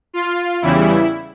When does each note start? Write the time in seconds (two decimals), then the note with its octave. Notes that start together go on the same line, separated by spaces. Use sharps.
0.13 F4
0.62 E2 C#3 E3 G3 E4